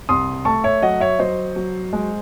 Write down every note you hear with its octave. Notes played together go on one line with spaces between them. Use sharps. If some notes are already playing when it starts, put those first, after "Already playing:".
C2 C6 D#6
A3 A5 C#6
C#5 E5
F#3 D#5 F#5
C#5 E5
F#3 C5 D#5
F#3
G#3